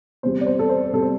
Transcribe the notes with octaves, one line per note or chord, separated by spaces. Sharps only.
E2 C3 G3 C5
D5
C5
A4
C5
E2 C3 G3 A4
C5